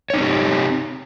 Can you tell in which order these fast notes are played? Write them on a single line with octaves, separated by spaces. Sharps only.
C#5 D#4 C4 G4